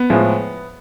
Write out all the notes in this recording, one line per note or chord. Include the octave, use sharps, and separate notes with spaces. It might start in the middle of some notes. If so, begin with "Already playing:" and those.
Already playing: B3
A2 F3 G#3